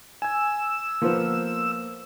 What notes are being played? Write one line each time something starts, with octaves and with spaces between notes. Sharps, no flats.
G#5 E6 G#6
F3 A#3 B3 C5